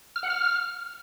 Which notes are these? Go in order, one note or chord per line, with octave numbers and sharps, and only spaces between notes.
F6
F#5
F6